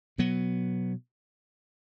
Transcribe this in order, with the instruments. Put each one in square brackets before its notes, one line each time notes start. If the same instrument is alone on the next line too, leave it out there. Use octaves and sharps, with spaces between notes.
[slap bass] B2 F#3 B3